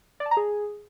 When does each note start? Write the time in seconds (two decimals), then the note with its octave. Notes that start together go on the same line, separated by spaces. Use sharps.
0.20 D5
0.26 A5
0.31 A#5
0.37 G#4